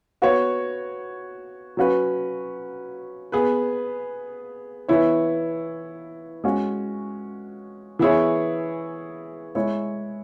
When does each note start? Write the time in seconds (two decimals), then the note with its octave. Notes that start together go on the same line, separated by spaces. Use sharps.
0.22 B3 F#4 C#5
1.77 F#3 C#4 F#4 B4
3.32 B3 G#4 B4
4.88 E3 B3 E4 C#5
6.44 G#3 C#4 F#4
7.99 E3 B3 E4 G#4 C#5
9.55 G#3 E4 C#5